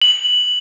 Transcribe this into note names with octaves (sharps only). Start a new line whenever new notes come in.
F#7